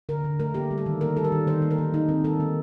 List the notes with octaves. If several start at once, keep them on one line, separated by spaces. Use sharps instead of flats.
D3 A#4
D3
A3 A#4
A#3 G4
G3
A4
D#3
A#3 A#4
G3 A4
A#4
D#3
D#3 C5
A#3
A#4
A#3
A#3 D#4
D#3 C4
D#3 A4
A#3